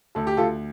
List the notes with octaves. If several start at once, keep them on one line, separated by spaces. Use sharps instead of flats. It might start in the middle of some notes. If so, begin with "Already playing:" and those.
D2 A4
G4
D2 F4 A4